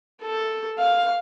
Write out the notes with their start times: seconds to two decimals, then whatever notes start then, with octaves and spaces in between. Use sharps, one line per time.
0.22 A4
0.78 F5